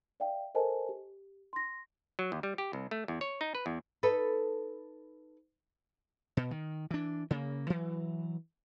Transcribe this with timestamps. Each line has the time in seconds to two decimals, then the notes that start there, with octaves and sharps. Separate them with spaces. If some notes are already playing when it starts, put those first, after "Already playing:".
0.20 D5 E5 F5 G5
0.55 A4 A#4 C5 D#5 G#5 A5
0.89 G4
1.53 C6 A#6
2.19 F#3
2.32 D#2
2.43 G3
2.58 G4
2.73 C2
2.91 A3
3.08 E2
3.21 C#5
3.41 D#4
3.55 B4
3.66 E2
4.03 D#4 A4 B4
6.37 B2
6.51 D#3
6.91 E3 D4
7.31 C#3 A#3
7.70 E3 F#3